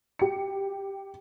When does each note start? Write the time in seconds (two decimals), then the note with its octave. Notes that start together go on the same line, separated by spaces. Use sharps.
0.19 G4 C#7